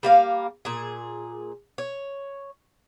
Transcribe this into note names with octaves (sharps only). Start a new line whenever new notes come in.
G3 A#3 F5
A#2 G#4
C#5